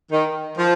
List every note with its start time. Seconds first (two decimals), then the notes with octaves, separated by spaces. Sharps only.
0.11 D#3
0.58 F3